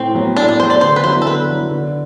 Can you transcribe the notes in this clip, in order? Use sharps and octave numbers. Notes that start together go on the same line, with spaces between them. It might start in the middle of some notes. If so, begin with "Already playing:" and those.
Already playing: A2 C4
F#3 B3
A2 D4
D4
F#3 B3 C5
D5
D3 C5
B4
F#3 B3 E4 C5
A4
D3 B4
F#3 B3 E4
D3